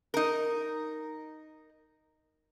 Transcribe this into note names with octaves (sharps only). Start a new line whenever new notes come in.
D#4 A#4